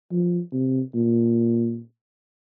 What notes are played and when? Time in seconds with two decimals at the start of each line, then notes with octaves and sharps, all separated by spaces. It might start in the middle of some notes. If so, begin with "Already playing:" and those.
0.11 F3
0.52 C3
0.94 A#2